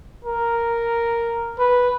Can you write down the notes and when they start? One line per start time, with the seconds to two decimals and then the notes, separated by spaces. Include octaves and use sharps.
0.25 A#4
1.59 B4